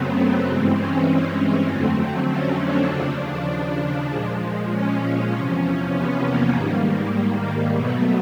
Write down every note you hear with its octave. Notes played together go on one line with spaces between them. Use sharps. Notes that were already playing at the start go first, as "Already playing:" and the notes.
Already playing: F#2 C#3 F#3 A3 B3 C4
C4
G2 E3 G#3 C4
C#4
C4
F2 D3 F#3 A3
C#4
D4
D#2 C#3 F3 D4
A#2 F3 G#3
C#4
E2 C3 F3
B3
A#3
G#2 D#3 G3 A#3
B2 F#3 A3 B3